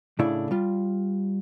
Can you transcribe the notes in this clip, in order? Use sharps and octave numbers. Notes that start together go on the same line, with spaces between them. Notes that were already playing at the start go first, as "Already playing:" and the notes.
A2 C#3 A3 D4 E4 D5
G3 F4